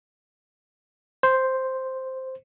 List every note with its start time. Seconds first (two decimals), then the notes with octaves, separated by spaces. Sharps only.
1.23 C5